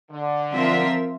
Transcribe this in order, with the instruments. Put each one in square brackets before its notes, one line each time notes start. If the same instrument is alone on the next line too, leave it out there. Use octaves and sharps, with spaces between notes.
[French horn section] D3
[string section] F3 C4 F4 A#4 E5